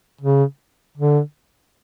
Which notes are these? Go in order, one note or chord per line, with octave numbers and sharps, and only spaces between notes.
C#3
D3